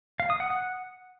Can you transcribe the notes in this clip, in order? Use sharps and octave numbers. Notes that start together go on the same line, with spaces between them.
F5
D#6
F#5
F#5